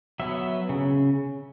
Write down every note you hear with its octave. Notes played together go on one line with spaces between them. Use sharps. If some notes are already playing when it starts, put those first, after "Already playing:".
F#3 B3 E5
C#3